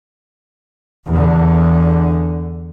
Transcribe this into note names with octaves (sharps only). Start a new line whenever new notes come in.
E2 D3